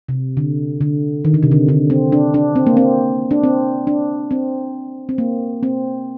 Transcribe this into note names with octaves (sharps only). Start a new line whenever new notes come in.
C3
D3
D3
D#3
D3
C3
D3
D3
C4
D4
D4
C4
A#3
C4
D4
C4
D4
C4
C4
A#3
C4